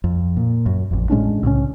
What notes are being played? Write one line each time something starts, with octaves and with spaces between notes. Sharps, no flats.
F2
A#2
F#2
A1 F2
A2 G#3 C#4 D4
C2 A2 C#3 C#4